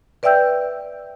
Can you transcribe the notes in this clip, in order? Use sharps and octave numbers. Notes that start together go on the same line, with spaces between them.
B4 D5 E5 G5 E6 G6